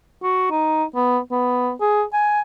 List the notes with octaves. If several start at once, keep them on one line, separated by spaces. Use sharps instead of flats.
F#4
D#4
B3
B3
G#4
G#5